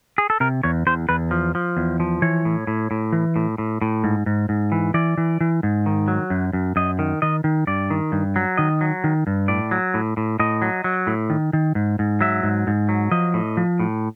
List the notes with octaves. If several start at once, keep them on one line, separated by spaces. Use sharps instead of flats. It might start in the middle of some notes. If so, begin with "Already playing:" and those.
G#4
A4
C3 A#4
E2 C#5
E2 C5
E2 B4
F3
F3
E2
F3
E3 C#5
A2
A2
A2
E3
A2
A2
A2
G#2
G#2
G#2
E3
E3 D5
E3
E3
G#2
D#3
F#3
F#2
F#2
F#2 D#5
D#3
D#3 D#5
D#3
G2 D5
D#3
G2
F#3
D#3 D#5
F#3
D#3
G2
A2 D5
F#3
A2
A2
A2 D#5
F#3
F#3
A2
D#3
D#3
G#2
G#2
F#3 E5
G#2
G#2
F#3
F3 D#5
A2
F3
A2